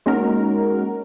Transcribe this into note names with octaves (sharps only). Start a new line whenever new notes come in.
G#3 A#3 C#4 D#4 F#4 A#4